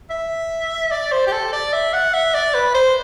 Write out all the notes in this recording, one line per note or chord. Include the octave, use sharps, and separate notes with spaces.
E5
D5
C5
G4
A4
D5
E5
F#5
E5
D5
B4
C5